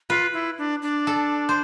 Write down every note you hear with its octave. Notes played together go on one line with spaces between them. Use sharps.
F4 B4
E4
D4
D4
A4
C5